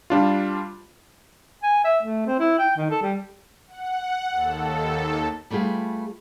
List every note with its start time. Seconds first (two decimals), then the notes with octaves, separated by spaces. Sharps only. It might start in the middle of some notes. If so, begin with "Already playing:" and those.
0.10 G3 D4 F4
1.63 G#5
1.84 E5
2.03 A3
2.27 C4
2.39 E4
2.59 G5
2.77 D#3
2.90 A4
3.02 G3
3.68 F#5
4.31 D#2 A4
5.50 G3 A3 B3 F4 G#4 B4